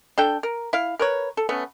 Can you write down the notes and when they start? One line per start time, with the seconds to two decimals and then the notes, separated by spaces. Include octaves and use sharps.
0.18 D4 A4 G5
0.43 A#4
0.73 E4 F5
0.99 A#4 B4 C#5
1.37 A4
1.49 A3 B3 C#4